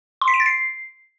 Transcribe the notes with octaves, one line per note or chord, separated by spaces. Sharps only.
C6
B6
D7
A6
C7